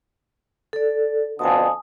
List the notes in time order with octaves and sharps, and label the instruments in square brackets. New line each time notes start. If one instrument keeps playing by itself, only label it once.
[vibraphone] A4 D5
[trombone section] F2 B2 D3 [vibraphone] G#5 A5 D#6